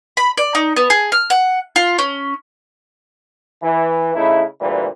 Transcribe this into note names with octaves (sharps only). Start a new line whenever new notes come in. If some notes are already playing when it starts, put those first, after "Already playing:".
B5
D5
D#4
B3
G#4
F6
F#5
F4
C#4
E3
C#3 A3 D#4 E4
D2 A#2 E3 G3 B4